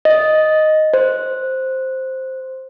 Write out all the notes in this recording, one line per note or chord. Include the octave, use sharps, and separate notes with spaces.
D#5
C5